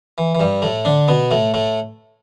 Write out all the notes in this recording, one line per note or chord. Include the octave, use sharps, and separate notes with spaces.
E3
E3
G2 G3
A2 A3
D3 D4
B2 B3
A2 A3
A2 A3